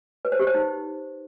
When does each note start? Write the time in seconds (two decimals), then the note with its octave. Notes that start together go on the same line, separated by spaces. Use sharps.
0.25 B4
0.32 C5
0.40 G4
0.47 C5
0.54 D#4